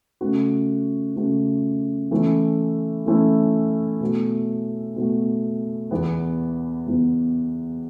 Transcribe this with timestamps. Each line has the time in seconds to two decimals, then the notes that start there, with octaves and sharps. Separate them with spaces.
0.21 C#3 A3 F#4
1.16 C#3 A3 F#4
2.11 E3 A3 C#4 E4
3.06 E3 A3 C#4 E4
4.01 B2 A3 F#4
4.96 B2 A3 F#4
5.91 E2 E3 B3
6.86 E2 E3 B3